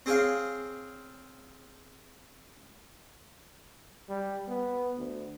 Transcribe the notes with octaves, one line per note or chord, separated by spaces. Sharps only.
C4 G#4 C#5 F5
G3
B3
D2